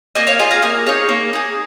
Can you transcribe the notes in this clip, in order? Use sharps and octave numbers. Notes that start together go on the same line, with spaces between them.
A#3 D#5 G#5
C#5 F5
F4 G#4 D#5 G#5
F5 A#5
A#3 D#5 G#5
D#4 G#4 C#5 F5
A#3
D#4 G#4